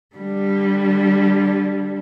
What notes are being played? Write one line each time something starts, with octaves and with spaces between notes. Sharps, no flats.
D3 G3